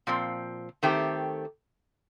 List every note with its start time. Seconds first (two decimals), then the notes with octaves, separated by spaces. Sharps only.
0.07 A#2 F3 C4
0.83 D#3 A3 C4 G4